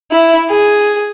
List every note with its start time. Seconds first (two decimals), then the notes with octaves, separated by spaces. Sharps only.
0.12 E4
0.50 G#4